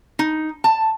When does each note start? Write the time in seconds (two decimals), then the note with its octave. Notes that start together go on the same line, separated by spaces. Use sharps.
0.19 D#4
0.64 A5